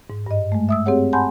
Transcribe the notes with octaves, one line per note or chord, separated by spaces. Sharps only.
G#2
G2 D#5
G#3 A3
E5 D#6 E6
C4 G4 G#4 C#5 F#5
F#5 G#5 A5 B5 C6 G6